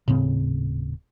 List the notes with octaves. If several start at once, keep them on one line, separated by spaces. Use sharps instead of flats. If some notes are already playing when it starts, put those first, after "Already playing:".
D#1 A2 C#3 C4